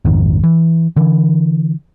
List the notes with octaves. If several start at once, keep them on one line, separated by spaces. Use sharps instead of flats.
A#1 F2 G#2 D#3
E3
D3 E3